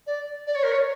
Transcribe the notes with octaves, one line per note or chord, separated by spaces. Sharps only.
D5
D5
C#5
A#4
C#5